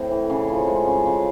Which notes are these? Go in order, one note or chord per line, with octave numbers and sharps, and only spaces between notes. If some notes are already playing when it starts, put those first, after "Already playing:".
Already playing: A2 C4
E3
C#3
F3
G#3
C#3
C#3